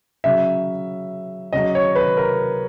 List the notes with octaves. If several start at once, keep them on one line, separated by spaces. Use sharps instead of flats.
C#3 F#3 E5
C#3 F#3 D#5
C#5
B4
A#4